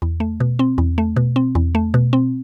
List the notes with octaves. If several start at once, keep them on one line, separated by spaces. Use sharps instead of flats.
E2
A3
B2
C4
E2
A3
B2
C4
E2
A3
B2
C4